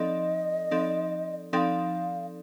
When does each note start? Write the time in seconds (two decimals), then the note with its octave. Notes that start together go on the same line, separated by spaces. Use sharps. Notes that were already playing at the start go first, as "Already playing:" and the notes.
Already playing: F3 C4 D#4 A4 D5 D#5
0.71 F3 C4 D#4 A4 D5
1.53 F3 C4 D#4 A4 D5 F5 G5